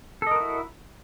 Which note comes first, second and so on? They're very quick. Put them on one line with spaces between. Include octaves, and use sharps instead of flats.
A4 D#5 A#4 F#4 E4